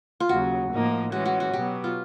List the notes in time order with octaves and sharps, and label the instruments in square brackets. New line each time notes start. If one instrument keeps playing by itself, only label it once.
[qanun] F4
[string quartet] D#2 C#3 F#3 [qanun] F#4
[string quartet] A2 F3 A#3 D#4
[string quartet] E3 G#3 C#4 [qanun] F#4
[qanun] F#4
F#4
[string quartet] B2 F#3 B3 [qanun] G4
[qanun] F4